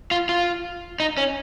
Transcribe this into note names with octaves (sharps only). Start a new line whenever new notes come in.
F4
F4
D#4
C#4